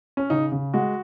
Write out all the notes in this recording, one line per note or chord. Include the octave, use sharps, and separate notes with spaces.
C#4
C#3 D#4
C#3
G#3 F#4